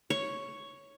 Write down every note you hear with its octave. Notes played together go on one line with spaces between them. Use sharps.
C#5